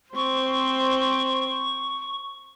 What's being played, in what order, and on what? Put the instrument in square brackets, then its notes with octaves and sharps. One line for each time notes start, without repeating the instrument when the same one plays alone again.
[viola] C4 C5 [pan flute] C#6